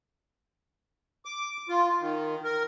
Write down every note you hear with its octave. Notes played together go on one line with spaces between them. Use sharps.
D6
F4
D#3
A#4